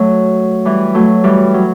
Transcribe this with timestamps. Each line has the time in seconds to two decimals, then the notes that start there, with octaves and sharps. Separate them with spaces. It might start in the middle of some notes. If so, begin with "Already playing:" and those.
Already playing: F#3 A3
0.65 E3 G3
0.94 F#3 A3
1.24 E3 G3
1.54 F#3